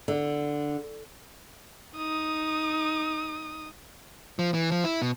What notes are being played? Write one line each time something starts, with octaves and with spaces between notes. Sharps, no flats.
D3
D#4 D#6
F3
E3
F3
E4
B2